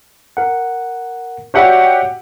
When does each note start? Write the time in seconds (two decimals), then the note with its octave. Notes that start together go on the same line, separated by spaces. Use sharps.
0.37 A#4 F#5
1.54 F#4 G4 C#5 D5 E5 F#5